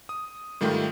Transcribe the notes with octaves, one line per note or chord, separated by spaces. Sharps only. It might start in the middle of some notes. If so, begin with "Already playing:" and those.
D#6
G#2 D#3 G3 A3 F4 G4